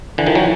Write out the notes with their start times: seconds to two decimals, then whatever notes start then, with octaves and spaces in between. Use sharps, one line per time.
0.18 D3 E3
0.26 D#3 F3
0.35 E3 F#3